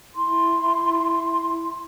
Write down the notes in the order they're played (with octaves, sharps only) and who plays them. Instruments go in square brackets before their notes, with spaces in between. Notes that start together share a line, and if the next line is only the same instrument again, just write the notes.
[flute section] E4 C6